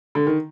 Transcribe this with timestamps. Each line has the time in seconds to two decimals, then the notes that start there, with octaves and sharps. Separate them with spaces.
0.15 D3
0.27 D#3